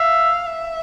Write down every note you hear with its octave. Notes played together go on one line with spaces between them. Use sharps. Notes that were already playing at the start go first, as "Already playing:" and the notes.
Already playing: E5 F5
E5